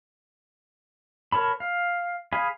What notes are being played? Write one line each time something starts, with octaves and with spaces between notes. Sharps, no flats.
A#4 C#5 A5 B5
F5
G#4 F5 G#5 B5